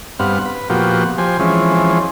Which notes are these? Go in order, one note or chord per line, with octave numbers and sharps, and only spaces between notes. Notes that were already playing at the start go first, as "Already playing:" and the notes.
G2 B3 C4 F5 F#5
B4
A#2 F3 B3 F#4 G4
F3 G4 C5 G#5
E3 F3 G#3 C4 C#4